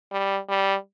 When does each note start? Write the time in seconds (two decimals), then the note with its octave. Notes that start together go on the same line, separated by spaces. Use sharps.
0.12 G3
0.49 G3